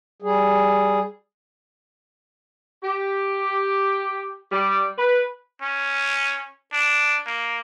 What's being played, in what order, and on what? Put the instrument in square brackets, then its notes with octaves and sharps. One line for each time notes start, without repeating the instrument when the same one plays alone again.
[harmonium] G3 G#4
[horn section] G4
G3
B4
[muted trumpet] C#4
D4
A#3